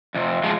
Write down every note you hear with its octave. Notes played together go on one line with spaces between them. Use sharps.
F2 C3
F3 G#3